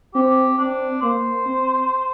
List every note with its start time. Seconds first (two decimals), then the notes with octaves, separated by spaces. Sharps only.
0.14 C4 G4
0.58 C4 D4
1.02 A#3 C5
1.46 C4